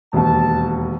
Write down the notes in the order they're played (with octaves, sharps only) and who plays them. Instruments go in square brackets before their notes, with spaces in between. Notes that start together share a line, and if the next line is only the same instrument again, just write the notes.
[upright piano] E1 D#2 [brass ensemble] A5